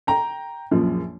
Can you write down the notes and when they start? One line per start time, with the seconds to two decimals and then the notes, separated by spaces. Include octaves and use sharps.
0.07 G5 A#5
0.71 A#1 F#2 F3